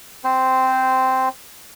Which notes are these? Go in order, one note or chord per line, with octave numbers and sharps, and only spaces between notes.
C4 C5